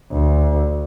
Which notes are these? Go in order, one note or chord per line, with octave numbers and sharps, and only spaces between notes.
D2